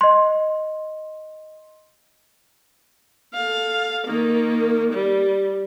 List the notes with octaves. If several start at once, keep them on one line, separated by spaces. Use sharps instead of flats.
D#5 C6
A4 F5
D#3 A#3
G3